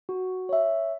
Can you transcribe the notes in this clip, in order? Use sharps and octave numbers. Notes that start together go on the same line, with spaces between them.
F#4
C#5 E5